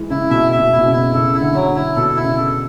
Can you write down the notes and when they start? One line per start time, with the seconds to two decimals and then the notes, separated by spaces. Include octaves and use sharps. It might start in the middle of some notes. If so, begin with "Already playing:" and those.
Already playing: E3 G#3
0.10 C#3 E4
0.30 B2 E5
0.52 E5
0.59 B2
0.72 E4
0.78 B2
0.86 C#3
0.93 E4
1.13 C#3 A4
1.35 E4
1.41 D3
1.54 F#3
1.69 D3
1.76 E4
1.96 B2 A4
2.16 E4
2.24 C#3
2.37 A4